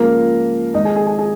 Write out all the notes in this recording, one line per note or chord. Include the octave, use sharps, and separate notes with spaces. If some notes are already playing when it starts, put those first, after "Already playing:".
Already playing: C#2 C#3 F3 A#3 A#4
G#1 G#2 F3 D#4 D#5
G#4 G#5
G#4 G#5
G#4 G#5
G#4 G#5